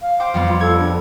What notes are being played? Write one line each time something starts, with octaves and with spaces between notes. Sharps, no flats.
F5
C5 G5 D6
F2 G3 B3
F4
A4 G#6
D4